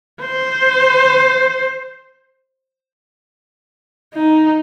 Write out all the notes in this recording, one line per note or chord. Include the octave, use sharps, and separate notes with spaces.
C5
D#4